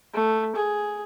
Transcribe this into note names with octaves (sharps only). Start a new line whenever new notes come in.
A3
G#4